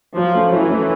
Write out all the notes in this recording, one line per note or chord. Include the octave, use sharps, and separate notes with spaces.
F3 F#3
A3 C#4
E3 F#3
A3 C#4